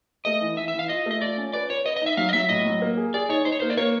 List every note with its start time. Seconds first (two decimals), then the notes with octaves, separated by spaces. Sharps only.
0.25 A3 D#5
0.41 E3
0.57 E3 E5
0.68 E5
0.74 E3
0.79 F5
0.89 F4 D#5
1.06 A3 D#5
1.22 F4 D5
1.37 C#4
1.53 B4 D5
1.70 B4 C#5
1.85 B4 D#5
1.96 D#5
2.02 D#4 E5
2.17 F#3 F5
2.29 D#5
2.33 F#3 E5
2.49 A2 D#5
2.66 F#3
2.82 A#3
2.97 G#4
3.14 G#4 D5
3.29 D#4 C#5
3.45 D#4 C5
3.52 C#5
3.60 A#3 C5
3.70 D5
3.77 A#3 C#5